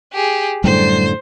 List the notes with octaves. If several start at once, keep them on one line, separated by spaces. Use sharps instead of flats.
G4 G#4
F#2 A2 D3 G3 C5